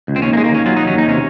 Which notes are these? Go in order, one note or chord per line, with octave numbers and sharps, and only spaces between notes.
C#2
C4
D#2 C#4
A#3
G#3
A#3
D#2 C#4
F#3 F4
D#4
F#3
C#4
D#2 D#4
C3 C#4